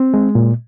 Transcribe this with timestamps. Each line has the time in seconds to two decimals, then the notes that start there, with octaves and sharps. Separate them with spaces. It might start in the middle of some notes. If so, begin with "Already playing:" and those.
Already playing: C4
0.14 G#3
0.35 A#2